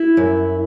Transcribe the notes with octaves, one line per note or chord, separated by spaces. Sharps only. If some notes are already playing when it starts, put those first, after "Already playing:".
Already playing: E4
F#2